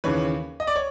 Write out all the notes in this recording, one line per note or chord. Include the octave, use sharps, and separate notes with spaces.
D#2 C#3 E3 B4 C#5
D#5
D5
C#5